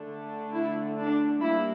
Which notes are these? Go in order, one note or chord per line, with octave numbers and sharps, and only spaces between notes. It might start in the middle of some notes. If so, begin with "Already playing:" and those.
Already playing: D3 A3 D4
E4
D4
G3 A#3 D4 E4